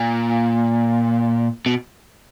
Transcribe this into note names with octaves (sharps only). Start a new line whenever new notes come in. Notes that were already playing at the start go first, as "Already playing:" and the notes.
Already playing: A#2
B2